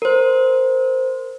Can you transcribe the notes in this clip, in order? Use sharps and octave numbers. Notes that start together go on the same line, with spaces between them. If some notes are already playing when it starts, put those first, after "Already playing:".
A#4 C5